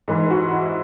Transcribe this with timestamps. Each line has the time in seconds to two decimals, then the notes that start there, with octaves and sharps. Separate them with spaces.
0.08 G#2 E3
0.30 F#4
0.51 E4